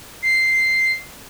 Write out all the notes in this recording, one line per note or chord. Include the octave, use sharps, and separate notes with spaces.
C7